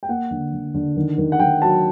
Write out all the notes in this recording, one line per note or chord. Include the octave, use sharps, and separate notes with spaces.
G5
A#3 F#5
D3
D3
D3
D#3
D#3
F#5
D#3 G5
F#3 A5